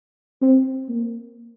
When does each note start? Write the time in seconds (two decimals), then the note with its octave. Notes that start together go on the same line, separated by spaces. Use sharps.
0.42 C4
0.89 A#3